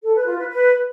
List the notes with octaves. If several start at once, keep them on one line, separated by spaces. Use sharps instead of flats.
A4
B4
F4
B4
B4